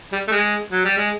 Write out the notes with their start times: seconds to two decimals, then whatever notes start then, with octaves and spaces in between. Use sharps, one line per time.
0.12 G3
0.28 A3
0.32 G#3
0.72 F#3
0.85 G3
0.98 G#3